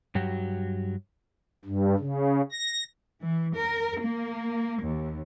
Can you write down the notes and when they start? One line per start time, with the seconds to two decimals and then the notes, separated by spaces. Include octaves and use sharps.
0.15 G2 F#3 F#4 G4
1.65 G2
1.99 C#3
2.52 A#6
3.21 E3
3.55 A#4
4.01 A#3
4.83 D#2